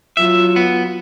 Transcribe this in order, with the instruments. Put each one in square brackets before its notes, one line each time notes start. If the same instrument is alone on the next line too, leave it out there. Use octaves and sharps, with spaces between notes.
[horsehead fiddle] F#3 F4 [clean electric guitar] E5
[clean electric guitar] B3